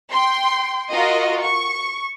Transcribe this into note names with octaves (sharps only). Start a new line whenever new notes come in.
G5 C6
F4 F#4 A#4 D#5
C#6